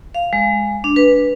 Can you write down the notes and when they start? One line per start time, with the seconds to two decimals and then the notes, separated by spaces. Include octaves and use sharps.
0.15 F5
0.33 G#3
0.84 D4
0.96 B4